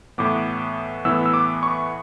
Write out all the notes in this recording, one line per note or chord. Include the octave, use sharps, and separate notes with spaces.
A2 E3 B3 D6
A2 E3 B3 E6
E6
D6
C#6